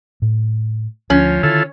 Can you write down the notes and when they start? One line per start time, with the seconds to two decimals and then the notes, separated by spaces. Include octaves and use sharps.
0.22 A2
1.10 D2 F3 C#4
1.43 D3 D#3 E4 F4 A4